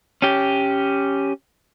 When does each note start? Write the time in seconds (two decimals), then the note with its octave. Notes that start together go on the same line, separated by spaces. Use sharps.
0.22 C#4 G4